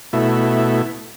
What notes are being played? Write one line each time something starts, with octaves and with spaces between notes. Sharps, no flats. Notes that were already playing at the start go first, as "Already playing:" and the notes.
B2 A3 E4